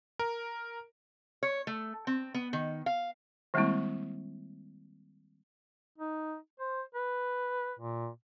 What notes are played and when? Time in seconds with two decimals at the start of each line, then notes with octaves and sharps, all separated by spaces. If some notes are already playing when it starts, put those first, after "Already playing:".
0.19 A#4
1.43 C#5
1.67 A3
2.07 C4
2.34 B3
2.53 D#3
2.86 F5
3.54 D#3 G3 G#3 A#3 C4 E4
5.98 D#4
6.60 C5
6.95 B4
7.79 A#2